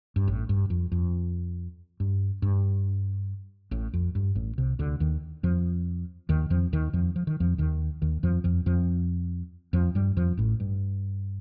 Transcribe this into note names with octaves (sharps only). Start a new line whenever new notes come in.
G2
A1 A2
G2
F2
F2
G2
G2
A1 A2
F2
G2
A1 A2
C2 C3
D2 D3
D#2 D#3
F2 F3
D#2 D#3
F2 F3
D#2 D#3
F2 F3
F3
D#3
F2 F3
D#2 D#3
D#2 D#3
F2 F3
F2 F3
F2 F3
F2 F3
G2 G3
F2 F3
A1 A2
G2